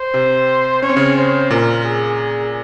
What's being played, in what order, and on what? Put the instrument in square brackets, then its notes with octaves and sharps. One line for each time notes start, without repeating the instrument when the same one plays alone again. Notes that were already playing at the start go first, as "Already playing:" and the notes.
Already playing: [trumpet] C5
[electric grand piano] C3 C4
[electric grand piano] C#4 [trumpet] C#5
[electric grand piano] C4
C#3 C#4
[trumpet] C5
[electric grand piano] A#2 A#3 [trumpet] A#4
[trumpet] G#4